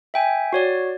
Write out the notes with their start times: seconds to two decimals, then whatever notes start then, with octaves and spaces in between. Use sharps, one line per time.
0.14 E5 G5 G#5
0.53 F#4 C#5 D5